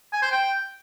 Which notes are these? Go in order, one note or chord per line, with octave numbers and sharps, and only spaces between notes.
G#5
C5
G5